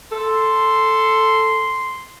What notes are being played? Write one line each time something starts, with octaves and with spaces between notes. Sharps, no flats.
A4 C6